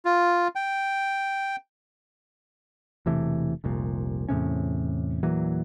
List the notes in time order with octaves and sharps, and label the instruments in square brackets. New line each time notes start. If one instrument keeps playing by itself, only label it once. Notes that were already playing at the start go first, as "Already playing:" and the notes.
[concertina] F4
G5
[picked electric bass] E1 C3 E3 A3
F1 C2 A#2
E2 A2 C3 C#4
E2 A#2 E3 F#3